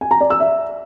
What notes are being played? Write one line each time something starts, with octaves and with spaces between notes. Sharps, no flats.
G#5
A#5
D5
E6
E5